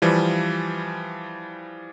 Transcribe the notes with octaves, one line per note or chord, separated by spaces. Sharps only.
E3 F3 G3